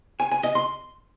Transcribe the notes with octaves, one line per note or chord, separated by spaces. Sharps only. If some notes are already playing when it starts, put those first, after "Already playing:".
G#5
G#5
D#5
C6